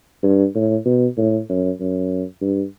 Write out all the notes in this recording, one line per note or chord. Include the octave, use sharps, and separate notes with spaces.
G2
A2
B2
A2
F#2
F#2
G2